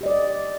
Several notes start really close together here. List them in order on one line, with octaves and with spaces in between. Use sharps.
G4 D#5 D5